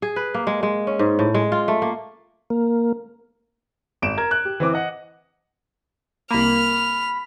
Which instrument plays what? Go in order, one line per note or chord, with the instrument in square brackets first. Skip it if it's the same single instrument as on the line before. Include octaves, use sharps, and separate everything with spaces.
[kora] G#4
B4
A#3
G#3
G#3
C#4
G#2
A2
G#3
F4
A3
A#3
[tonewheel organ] A#3
[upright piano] G#1 D7 E7
A#4 G#6
F#6
G4
E3 C4 D6
D#5 F#5
[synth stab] C2 A#3 [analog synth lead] B5 [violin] F6